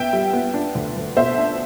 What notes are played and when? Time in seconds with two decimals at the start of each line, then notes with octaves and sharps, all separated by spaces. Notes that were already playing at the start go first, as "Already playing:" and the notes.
Already playing: B3 E5 G5
0.13 G3
0.33 B3
0.54 D4
0.75 D2
0.96 D2
1.16 B2 C5 E5
1.38 D4